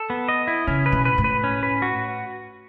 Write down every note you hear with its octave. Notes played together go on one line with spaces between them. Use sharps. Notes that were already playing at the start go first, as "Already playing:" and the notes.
Already playing: A4
B3
D#5
E4
C#3 C#4
B4
B2
B4
A2
B4
C#4
B4
F#4